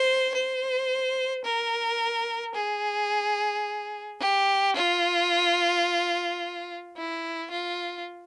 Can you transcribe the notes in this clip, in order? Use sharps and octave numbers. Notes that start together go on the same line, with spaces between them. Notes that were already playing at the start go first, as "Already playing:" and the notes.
Already playing: C5
C5
A#4
G#4
G4
F4
E4
F4